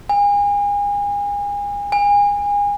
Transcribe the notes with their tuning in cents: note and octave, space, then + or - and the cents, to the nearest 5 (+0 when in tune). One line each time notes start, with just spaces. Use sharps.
G#5 -35
G#5 -30